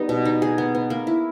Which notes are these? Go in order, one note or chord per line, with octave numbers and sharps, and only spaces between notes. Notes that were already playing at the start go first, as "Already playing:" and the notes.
Already playing: G3 B3 D#4
B2
D#4
G#4
B3
B3
A#3
E4